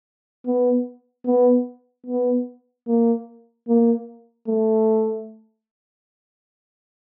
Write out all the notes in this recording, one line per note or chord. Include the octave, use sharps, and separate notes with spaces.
B3
B3
B3
A#3
A#3
A3